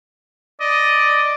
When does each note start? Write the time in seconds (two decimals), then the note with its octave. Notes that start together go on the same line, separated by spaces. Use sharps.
0.61 D5 D#5